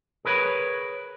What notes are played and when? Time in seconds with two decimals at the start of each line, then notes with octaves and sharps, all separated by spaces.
0.25 G#4 A#4 B4 C#5